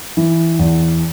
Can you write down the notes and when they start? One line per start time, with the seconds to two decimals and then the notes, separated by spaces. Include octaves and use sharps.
0.17 E3
0.59 E2